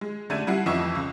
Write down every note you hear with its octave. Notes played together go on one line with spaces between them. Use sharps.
G#3
D3 A3 D4 A5 G#6 D#7
G3 E4 F#5 C7
F2 E3 D#5 E5 C#6 E6
C#2